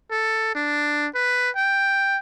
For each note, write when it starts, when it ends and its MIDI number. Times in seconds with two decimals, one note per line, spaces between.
0.11 0.52 69
0.55 1.08 62
1.15 1.50 71
1.56 2.19 79